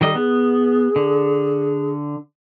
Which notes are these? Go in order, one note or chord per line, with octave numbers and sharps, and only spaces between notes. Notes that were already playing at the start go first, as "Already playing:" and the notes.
D#3 G3 A4 D#5
B3 G#4
D3